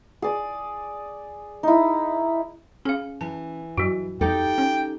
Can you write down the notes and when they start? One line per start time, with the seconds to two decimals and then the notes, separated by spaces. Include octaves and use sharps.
0.22 G#4 D5
1.63 D#4 E4
2.85 C#4 G#4 F5
3.21 E3 A5
3.78 G2 F#3 F#4
4.21 F2 D#4 G4 A4 G5
4.58 C#4